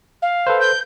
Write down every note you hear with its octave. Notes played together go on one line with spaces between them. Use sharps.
F5
A4 B4 C5
G6